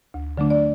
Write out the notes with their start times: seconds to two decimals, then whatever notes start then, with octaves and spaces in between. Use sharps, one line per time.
0.14 D2
0.38 D3 F#3 A3 D4
0.50 D5